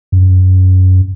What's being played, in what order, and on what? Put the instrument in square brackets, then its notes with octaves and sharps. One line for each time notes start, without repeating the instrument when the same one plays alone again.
[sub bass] F#2